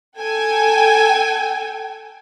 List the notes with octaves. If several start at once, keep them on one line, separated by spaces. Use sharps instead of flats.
A4 G5 G#5